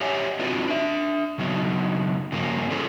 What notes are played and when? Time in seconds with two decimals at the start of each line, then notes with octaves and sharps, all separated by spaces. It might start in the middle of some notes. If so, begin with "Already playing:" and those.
0.01 G4 C#5 D#5 E5 F#5 G#5
0.39 C4 D4 D#4 F4 F#4 B4
0.67 D4 E5
1.38 C#3 F#3 B3 D#4
2.32 G2 C#3 F3 F#3 A#3 C#4
2.70 C#4 F4 G#4 A4 B4 C5